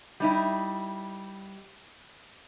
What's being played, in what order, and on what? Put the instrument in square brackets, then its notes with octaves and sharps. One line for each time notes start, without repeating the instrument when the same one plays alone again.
[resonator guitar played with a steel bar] G3 D#4 E4